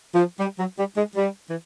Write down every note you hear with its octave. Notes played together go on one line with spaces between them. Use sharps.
F3
G3
F#3
G3
G#3
G3
E3